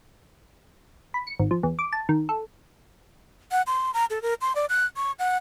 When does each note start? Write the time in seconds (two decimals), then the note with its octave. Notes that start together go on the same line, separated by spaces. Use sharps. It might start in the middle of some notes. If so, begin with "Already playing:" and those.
1.14 B5
1.27 C#7
1.40 G#1
1.51 F3
1.63 E2
1.79 D6
1.93 A5
2.09 D#3
2.29 A4
3.51 F#5
3.67 C6
3.94 A#5
4.10 A4
4.22 A#4
4.41 C6
4.55 D5
4.69 F#6
4.96 C#6
5.19 F#5